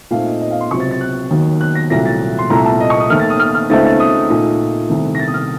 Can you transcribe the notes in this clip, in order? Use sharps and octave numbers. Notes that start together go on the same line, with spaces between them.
A#2 A3 C4 D#4 F5
D#5
D#5
F5
C6
C#2 C3 F#3 C4 C#6
A6
A6
F#6
D#2 D#3 F#3
F#6
A#6
C2 A#2 F#3 A3 A#6
A6
C6
C2 A#2 A3 A#5
A5
D#5
C#6
D#6
D#2 D#3 A3 F6
A6
D#6
F6
F6
C#2 C#3 A3 C4 D#4 A6
A6
D#6
A#2 A3 D#4
C2 C3 D#3 A3
A#6
A6
D#6
F6